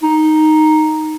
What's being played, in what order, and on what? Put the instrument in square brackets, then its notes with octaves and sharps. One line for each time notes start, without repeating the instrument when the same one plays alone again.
[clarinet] D#4